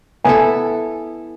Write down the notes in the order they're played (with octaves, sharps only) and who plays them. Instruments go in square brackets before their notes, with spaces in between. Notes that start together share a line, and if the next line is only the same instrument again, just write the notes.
[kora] B3 E4 A4 [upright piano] G#5